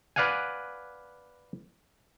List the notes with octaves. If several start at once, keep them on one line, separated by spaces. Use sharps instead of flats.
B4 D5 F5 F#5 G#5